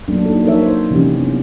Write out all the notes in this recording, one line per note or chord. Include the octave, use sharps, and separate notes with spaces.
F#3 A3 A#3 D4
A#3 D#4 A4
F3 D#4 A#4 C#5 E5
D#4 C5
C3 E3 F3 C#4 G4
B3 D4